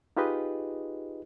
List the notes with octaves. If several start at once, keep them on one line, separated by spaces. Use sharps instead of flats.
D#4 F4 G4 G#4 B4 D#5